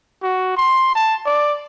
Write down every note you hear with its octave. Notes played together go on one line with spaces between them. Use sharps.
F#4
C6
A5
D5